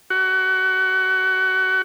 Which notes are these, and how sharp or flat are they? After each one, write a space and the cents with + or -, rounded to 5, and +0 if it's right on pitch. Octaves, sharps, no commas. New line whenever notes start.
F#4 +25